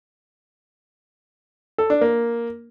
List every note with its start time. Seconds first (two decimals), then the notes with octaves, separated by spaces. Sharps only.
1.78 A4
1.90 D4
2.01 A#3